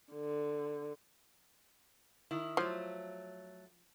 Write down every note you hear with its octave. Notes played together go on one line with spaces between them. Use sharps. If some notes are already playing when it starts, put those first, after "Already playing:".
D3
D#3 E4
F3 F#3 A3